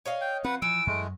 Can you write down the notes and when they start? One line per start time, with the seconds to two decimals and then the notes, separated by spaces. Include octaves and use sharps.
0.05 C#5 D#5 F5
0.21 G5
0.44 F3 C4 B4 F#5
0.62 E3 F3 E6 D7
0.87 F#2 G#3 A3